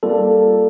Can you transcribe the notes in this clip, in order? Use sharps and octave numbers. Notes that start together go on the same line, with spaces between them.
G3 A#3 F4 A4 A#4 D5